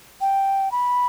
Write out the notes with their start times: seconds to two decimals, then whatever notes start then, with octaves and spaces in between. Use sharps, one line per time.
0.21 G5
0.72 B5